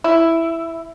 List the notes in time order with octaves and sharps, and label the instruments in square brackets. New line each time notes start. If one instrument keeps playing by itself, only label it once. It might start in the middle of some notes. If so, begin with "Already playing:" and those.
[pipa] E4